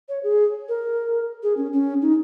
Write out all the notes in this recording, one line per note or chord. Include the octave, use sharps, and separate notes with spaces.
C#5
G#4
A#4
G#4
C#4
C#4
D#4